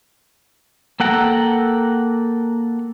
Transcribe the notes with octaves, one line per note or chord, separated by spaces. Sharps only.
A#3 A4 F#5 G5 A#5